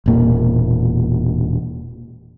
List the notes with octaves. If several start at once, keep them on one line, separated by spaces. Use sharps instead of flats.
E1 A#2 A#3